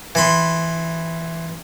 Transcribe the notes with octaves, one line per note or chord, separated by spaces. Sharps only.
E3 B5 C6